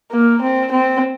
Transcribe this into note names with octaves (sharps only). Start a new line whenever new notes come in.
A#3
C4
C4